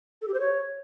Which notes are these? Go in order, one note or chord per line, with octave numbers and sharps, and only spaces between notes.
A4
G4
C5
C#5